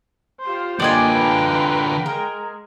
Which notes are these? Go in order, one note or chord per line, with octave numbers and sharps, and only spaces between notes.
F4 G4 C5
D3 A#3 F4 D5 D#5 G5 G#5
B4 F5 A#5
G#3 A#4